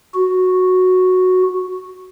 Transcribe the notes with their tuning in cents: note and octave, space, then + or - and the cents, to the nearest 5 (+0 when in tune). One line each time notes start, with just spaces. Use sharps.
F#4 -5